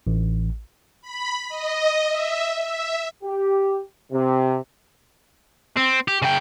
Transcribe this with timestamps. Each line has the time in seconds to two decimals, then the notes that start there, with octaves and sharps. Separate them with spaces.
0.07 A1
1.01 B5
1.49 D#5
2.08 E5
2.65 E5
3.24 G4
4.12 C3
5.77 C4
6.08 G4
6.22 C#3 G5